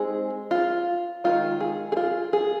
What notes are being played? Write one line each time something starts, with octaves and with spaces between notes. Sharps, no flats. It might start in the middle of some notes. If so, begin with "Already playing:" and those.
Already playing: G#3 C4 D#4 G#4
F4
D#3 G#3 D#4 F4
G#4
G#4
F4
G#4